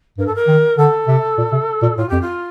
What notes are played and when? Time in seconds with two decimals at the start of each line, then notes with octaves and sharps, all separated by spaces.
0.18 G2 A#4
0.26 A4
0.35 A#4
0.48 D#3
0.78 D3 A4
1.07 C3
1.38 A#2
1.52 C3
1.82 A#2
1.96 A2 F4
2.09 F2 G4
2.21 F4